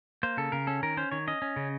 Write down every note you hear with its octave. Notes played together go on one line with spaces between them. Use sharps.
A#3 C5
C#3 A4
C#3 A#4
C#4 A4
D#3 A#4
C#4 C5
D#3 C#5
C#4 D#5
C#4
C#3